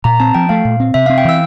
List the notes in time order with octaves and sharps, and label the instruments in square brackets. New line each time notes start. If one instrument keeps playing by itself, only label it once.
[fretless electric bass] A#2 [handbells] A#5
[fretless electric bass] C4 [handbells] A5
[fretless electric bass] F3 [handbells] G5
[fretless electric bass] A3 [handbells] F5
[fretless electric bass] A#2
C4
[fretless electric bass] C3 [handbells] E5
[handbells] F5
[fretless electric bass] C4
[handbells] G5
[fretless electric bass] E3 [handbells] E6